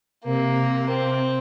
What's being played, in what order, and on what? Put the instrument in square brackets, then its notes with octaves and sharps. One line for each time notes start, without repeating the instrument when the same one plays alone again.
[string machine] C3 [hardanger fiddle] A#3
[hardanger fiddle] C4